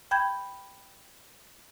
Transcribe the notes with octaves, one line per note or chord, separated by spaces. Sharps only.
G5 B5 G6 G#6